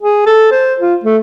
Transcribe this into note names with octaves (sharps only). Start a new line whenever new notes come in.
G#4
A4
C5
F4
A3